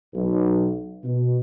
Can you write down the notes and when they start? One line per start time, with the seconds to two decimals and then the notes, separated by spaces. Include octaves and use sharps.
0.14 B1
1.04 B2